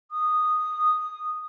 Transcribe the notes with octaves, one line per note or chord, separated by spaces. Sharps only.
D#6